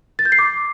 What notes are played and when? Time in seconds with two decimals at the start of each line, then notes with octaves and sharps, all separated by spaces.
0.19 A6
0.25 G6
0.32 C7
0.39 D6